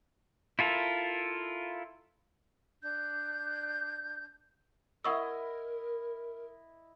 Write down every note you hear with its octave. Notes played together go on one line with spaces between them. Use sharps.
E4 F4 A4 A#4
D4 G6
E4 A#4 D#5 F#5 C#6 E6